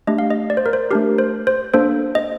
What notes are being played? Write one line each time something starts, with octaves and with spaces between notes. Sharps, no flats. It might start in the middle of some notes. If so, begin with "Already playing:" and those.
A3 D4 G4 D#5
F5
D#5
D5
C5
A#4
C5
A3 D4 G4 A#4
C5
C5
A#3 D4 A4 C5
D#5